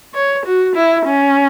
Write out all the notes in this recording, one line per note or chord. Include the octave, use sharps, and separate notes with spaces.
C#5
F#4
E4
C#4